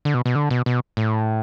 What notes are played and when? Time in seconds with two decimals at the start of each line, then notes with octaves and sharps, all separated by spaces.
0.05 D3
0.14 B2
0.26 B2
0.35 D3
0.51 B2
0.66 B2
0.97 A2